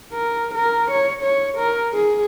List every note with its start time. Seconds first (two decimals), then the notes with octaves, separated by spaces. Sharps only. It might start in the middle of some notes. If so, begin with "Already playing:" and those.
0.13 A#4
0.55 A#4
0.91 C#5
1.22 C#5
1.58 A#4
1.93 G#4